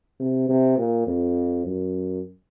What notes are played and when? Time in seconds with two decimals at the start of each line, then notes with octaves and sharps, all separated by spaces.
0.20 C3
0.49 C3
0.78 A#2
1.07 F2
1.66 F#2